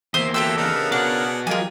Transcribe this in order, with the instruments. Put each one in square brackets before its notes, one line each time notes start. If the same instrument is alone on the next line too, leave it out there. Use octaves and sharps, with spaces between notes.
[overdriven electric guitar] E2 A#3 [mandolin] C5 C6 D#6 [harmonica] E5
[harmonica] F#3 B3 G5 [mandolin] G4 A4 E6 [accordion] E5 C6
[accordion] C#3 A#4 A#5 [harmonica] B3 D4 D#4
[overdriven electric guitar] B3 F#4 [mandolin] D4 [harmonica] G#4 D5 F#5
[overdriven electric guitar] F3 F#3 [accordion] G#3 A#3 F4 [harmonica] G4 [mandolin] A#4 G#5